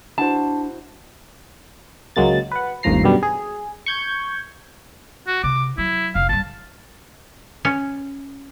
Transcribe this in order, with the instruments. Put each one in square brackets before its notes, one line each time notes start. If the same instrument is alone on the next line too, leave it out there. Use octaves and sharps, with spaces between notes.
[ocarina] D4 [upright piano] E4 F#4 C5 [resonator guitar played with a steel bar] A5
[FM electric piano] C#2 F#3 G#3 A#3 A6
B4 F#5
G1 D#2 A2 F3 A#5 C7
F#2 B2 D3 G3
G#4
C#6 G6 G#6
[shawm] F#4
[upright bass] C3 [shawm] D6
[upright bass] F#3 [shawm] E4
[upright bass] F1 [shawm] F5
[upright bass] G2 E3 [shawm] A5
[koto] C#4